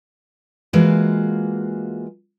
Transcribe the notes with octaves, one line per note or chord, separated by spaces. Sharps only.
E3 G#3 A#3 F4 F#4